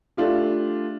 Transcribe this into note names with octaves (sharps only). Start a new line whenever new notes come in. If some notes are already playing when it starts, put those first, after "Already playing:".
A3 D4 F4 G4